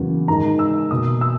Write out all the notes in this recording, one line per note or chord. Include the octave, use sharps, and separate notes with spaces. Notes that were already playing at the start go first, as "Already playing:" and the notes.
Already playing: E2 C#3 F#3 A#3
G#2 D#3 G#3 A#5
E6
B2 A#3 D#6
E6